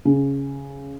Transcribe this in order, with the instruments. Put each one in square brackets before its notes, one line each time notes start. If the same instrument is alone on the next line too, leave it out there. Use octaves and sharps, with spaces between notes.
[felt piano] C#3